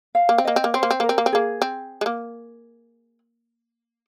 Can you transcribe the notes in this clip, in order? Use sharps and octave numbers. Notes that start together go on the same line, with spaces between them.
F5
A#3
C4
A#3 D#5
C4
A#3
C4 C5
A#3
C4
A#3 A#4
C4
A#3
C4
A#3 G#4
C4
G#3
A#3